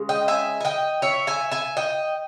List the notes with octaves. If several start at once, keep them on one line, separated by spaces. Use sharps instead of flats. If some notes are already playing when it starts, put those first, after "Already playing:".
Already playing: C#3 G#3
D#5 G5
E5 G#5
G#5
D#5 G5
C#5 E5
E5 G#5
E5 G#5
D#5 G5